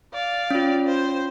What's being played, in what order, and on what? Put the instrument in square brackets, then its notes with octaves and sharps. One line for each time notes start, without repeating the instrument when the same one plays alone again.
[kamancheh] D5 F5
[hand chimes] C#4 F4
[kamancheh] C5